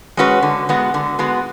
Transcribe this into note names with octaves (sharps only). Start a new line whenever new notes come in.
G#3 C#4 F#4 B4
D3
G#3 B3 F#4
D3
G#3 B3 F#4